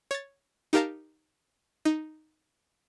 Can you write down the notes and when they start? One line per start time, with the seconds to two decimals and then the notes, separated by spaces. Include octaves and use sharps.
0.11 C#5 A6
0.73 D#4 G4 A#4 F5 A5 A#5
1.85 D#4